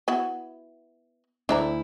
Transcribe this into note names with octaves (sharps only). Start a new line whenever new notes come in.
B3 E4 F#4
D2 D4 E4 E5 A#5